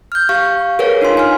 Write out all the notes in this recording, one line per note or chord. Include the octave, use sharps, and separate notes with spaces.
F6 G6
G4 F5 C#6
G#4 A#4 B4 C#5 F5 F#5
D4 D#4 F4 C6
G#5 F6